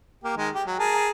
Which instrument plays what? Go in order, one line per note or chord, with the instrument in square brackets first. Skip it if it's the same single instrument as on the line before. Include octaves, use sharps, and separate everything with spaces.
[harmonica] A#3 G4
D#3 G#3
G4
F#3
G#4 A#4 A5